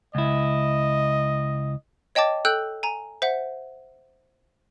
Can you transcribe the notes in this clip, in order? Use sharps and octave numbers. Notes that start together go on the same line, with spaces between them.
C#2 E4 D#5
C#5 D#5 G5 A5 D6 A6
A4 G5 E6 F#6 G6 F#7
G#5 A#5
C5 E5 F#5